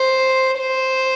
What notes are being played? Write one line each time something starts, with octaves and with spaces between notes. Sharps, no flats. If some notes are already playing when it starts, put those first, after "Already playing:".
Already playing: C5
C5